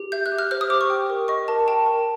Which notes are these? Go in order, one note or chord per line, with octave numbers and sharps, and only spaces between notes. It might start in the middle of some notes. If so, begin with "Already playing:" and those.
Already playing: G4
E5 G6
F#6
G4
F6
C5 F6
D#6
G4 D6
C#6
G5
A#4
D#5 C#6
A#4 A5
G5 A5
A#4